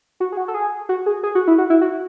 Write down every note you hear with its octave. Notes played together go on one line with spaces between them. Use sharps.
F#4
G#4
F#4
A4
G#4
F#4
G#4
G#4
F#4
E4
F#4
E4
F#4